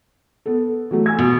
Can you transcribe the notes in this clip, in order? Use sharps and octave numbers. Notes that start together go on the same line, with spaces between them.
B3 A4
E3 F#3 A3
G#5 E6 G#6
B2